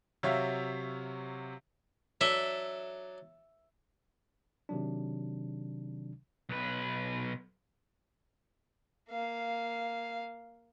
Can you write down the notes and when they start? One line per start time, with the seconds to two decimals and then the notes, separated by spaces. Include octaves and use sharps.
0.23 C3 F#3 C#5 E5 F5
2.21 F#3 D4 A4 E5
4.69 C3 D#3 F#3 D4
6.49 B1 B4
9.09 A#3 F5